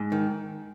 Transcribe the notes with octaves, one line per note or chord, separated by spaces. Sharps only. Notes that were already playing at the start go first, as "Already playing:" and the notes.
Already playing: G#2
D#3